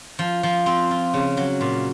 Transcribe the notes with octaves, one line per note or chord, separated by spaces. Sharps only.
F3
F3
C4
F4
C#3
F#3
A#2